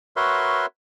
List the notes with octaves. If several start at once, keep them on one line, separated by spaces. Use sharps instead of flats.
F#4 A#4 B4 C#5 E5 C6